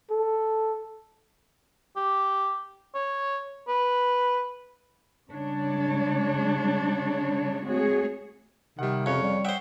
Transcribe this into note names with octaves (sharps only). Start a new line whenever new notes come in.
A4
G4
C#5
B4
C#3 G3 G#3 D4 C#5
G#3 A3 C4 F#4 G#4 C#5
C3 D#3 G3 F#5
F2 C#3 C#5
G3
C5 E5 F#5 G5 D#6